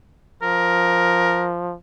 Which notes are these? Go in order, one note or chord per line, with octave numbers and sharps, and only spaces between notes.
F3 A#4